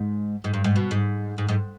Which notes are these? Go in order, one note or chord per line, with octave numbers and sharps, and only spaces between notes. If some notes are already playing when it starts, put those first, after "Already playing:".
Already playing: G#2
G#2
G2
G#2
B2
G#2
G#2
G#2